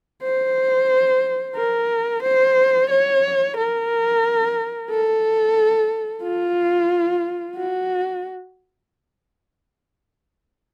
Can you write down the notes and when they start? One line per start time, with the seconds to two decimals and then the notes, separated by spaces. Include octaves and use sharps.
0.23 C5
1.56 A#4
2.23 C5
2.90 C#5
3.57 A#4
4.90 A4
6.23 F4
7.57 F#4